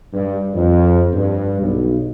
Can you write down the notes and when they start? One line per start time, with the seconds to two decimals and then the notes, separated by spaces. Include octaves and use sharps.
0.13 G2
0.53 F2
1.13 G2
1.61 B1